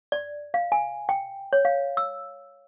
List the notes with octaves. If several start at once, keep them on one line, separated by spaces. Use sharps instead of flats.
D5
F5
G#5
G5
C#5
F5
E6